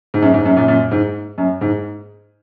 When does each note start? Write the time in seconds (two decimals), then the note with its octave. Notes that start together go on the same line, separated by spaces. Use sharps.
0.14 G#2
0.22 F#2
0.34 G#2
0.46 F#2
0.57 F#2 A#2
0.68 F#2 A#2
0.91 G#2
1.38 F#2
1.61 G#2